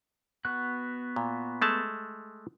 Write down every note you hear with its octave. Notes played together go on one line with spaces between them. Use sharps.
B3 F#4 F#6
A#2
G#3 A3 A5